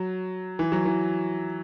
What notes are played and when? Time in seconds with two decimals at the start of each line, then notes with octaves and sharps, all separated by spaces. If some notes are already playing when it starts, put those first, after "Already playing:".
Already playing: F#3
0.59 E3
0.72 F#3
0.85 E3